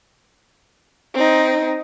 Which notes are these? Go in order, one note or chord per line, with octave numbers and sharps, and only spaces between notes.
C4 D#4